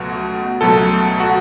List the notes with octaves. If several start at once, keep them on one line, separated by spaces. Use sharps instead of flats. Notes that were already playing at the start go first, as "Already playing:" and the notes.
Already playing: C#2 B2 F#3 A3 F#4
C#2 B2 F#3 A3 A4
F#4